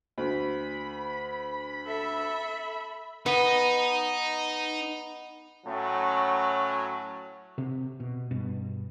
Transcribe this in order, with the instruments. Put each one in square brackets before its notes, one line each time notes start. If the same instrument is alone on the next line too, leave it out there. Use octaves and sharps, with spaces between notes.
[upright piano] D2 [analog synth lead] B5
[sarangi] A4 [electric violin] E5
[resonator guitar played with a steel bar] B3 [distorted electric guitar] D#4
[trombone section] A2 F#3 C#4
[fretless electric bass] C3
B2
G2 B2